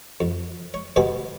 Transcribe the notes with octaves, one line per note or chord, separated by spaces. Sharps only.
F2
C#5
D2 G2 B2 B3 G#5